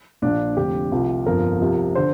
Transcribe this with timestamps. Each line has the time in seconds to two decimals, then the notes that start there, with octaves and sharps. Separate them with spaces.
0.22 A#1 A#2 F3 D4
0.56 F1 F2 D3 G4
0.92 C2 C3 F3
1.25 G1 F2 F3 A#4
1.60 C2 C3 F3
1.95 D3 C5